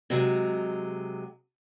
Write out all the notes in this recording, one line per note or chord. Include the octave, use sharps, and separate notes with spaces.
C3 F#3 G#3